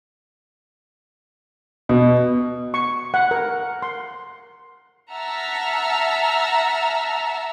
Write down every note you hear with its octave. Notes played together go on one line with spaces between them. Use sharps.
B2
C#6
F#5
A#4
C6
E5 F#5 A5 A#5 E6 F6